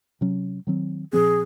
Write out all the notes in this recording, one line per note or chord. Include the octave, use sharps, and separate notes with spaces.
C3 F#3 C#4
D#3 F#3 C4
A#2 F3 C4 G#4